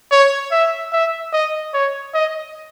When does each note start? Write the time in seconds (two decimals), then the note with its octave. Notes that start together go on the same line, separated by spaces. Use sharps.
0.12 C#5
0.52 E5
0.93 E5
1.33 D#5
1.74 C#5
2.14 D#5